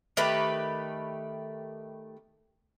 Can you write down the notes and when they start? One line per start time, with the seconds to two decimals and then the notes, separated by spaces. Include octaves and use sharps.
0.17 D#3 A3 G4 B4